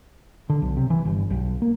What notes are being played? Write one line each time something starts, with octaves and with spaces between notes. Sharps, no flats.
D3
B1
C3
E3
G1
B1
A#3